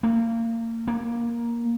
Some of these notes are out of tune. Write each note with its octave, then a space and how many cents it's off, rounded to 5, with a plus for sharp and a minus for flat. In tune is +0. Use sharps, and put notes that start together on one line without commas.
A#3 -30
A#3 +10